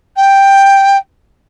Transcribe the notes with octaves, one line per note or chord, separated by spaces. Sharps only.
G5